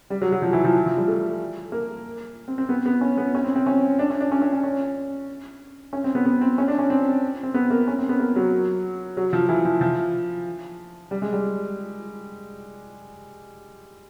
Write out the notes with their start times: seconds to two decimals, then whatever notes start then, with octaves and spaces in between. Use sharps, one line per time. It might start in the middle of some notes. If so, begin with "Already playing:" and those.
0.10 G3
0.22 F#3
0.32 F#3
0.42 F3
0.53 E3
0.64 F3
0.86 F3
0.97 G3
1.08 A3
1.72 A#3
2.48 C4
2.58 C4
2.69 B3
2.86 B3
3.01 C#4
3.17 B3
3.35 C#4
3.44 C4
3.56 C4
3.66 C#4
3.99 D4
4.10 C#4
4.20 D4
4.32 C#4
4.42 C#4
4.53 C#4
4.63 C#4
5.93 C#4
6.04 C4
6.15 B3
6.26 B3
6.41 C4
6.58 C#4
6.68 D4
6.79 C#4
6.90 C4
7.43 C4
7.54 B3
7.70 A#3
7.88 C#4
7.99 C4
8.09 B3
8.19 A#3
8.36 F#3
9.17 F#3
9.33 F3
9.49 E3
9.65 F3
9.81 F3
11.11 G3
11.22 G#3
11.33 G3